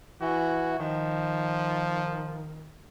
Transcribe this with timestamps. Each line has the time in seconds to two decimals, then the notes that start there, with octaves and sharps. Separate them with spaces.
0.21 E3 F#4
0.79 D#3 F3